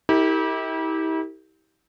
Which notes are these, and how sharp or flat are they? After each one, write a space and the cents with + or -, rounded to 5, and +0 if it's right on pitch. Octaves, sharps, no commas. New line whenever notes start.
E4 -40 G4 +0 A#4 -40